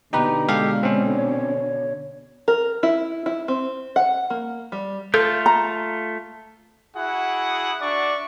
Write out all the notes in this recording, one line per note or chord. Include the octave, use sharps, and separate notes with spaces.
B2 D3 D#4 G4 B4 A#5
G#3 G4 A4 F5
C4 C#4
C#5
A#4
E4
E4
C4
F#5
A#3
G3
A3 F4 A4 G6
A#5
E4 F#4 G#4 F#5
D4 F#4 D5 E5 C#6